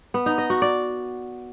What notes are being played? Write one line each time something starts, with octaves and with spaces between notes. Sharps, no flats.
B3
D#4
D#5
F#4
D5